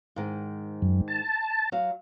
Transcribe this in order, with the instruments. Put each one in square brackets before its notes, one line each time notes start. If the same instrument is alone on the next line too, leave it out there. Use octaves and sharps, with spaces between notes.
[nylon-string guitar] G#2 D#3
[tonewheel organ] F#2
A5
[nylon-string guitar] F#3 F5